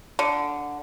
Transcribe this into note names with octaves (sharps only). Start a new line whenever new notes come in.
D3